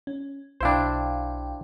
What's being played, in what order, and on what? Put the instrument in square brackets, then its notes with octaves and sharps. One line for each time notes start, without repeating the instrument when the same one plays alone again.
[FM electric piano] C#4
[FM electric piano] B1 F5 G5 [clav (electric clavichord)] D4 E4 C5